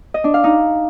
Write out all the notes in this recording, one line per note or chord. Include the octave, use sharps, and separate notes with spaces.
D#5
D4
F5
D#4